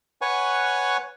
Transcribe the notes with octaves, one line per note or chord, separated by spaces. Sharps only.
B4 C#5 F#5 G#5 C#6